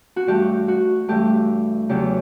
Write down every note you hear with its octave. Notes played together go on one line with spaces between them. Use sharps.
F#4
G2 E3 A3 G4
F#4
G2 E3 A3 G4
E2 C#3 F#3 G4